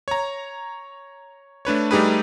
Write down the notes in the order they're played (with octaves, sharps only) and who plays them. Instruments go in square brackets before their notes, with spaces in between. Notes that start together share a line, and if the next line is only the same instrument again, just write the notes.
[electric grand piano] C#5 A#5
A3 D4 B4 C#5
G3 A3 D#4 G4 G#4 B4